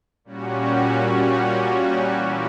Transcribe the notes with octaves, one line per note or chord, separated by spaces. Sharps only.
A#2 G3 C#4 F#4
E3 A#3 E4 G4